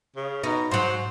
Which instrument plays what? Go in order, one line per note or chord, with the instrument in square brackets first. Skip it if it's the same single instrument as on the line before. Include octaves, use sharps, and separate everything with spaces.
[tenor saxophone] C#3
[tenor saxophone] B2 [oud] D#4
[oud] G#2 F#3 [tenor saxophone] C5